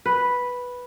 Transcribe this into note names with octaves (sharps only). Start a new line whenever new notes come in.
B4